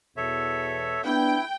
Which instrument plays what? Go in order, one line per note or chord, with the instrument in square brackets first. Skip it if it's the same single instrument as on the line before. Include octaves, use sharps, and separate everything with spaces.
[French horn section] E2 B2 [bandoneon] A4 C#5 E5
[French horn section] B3 [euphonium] D4 [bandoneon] E4 [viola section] G5